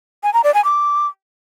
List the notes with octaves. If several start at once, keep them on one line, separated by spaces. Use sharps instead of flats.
G#5
A#5
D5
G#5
D6